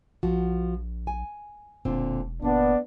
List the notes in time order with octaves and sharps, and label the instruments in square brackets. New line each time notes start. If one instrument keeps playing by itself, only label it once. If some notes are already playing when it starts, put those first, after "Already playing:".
[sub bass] A#1 [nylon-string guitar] F3 F#4
[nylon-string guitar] G#5
[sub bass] E1 [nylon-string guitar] A#2 D3 C4
[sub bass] F#1 [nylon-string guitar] A#2 A#3 [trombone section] B3 D4